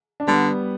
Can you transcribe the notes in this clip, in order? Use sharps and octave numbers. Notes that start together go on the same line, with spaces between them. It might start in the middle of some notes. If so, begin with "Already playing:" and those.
D4
D3 G3 B3